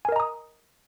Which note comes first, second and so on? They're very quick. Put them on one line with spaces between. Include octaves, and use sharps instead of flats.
G#5 A#4 D#5 A#5 D#6